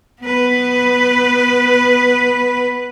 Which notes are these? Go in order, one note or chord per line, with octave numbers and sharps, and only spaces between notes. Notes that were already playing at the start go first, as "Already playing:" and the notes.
B3 B4